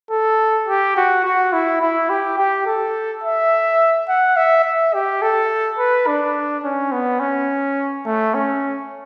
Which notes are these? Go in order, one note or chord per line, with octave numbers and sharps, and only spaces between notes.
A4
G4
F#4
F#4
E4
E4
G4
G4
A4
E5
F#5
E5
E5
G4
A4
B4
D4
C#4
B3
C#4
A3
C#4